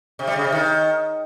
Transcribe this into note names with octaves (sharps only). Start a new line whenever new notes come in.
C3
G3
C#3
C3
D#3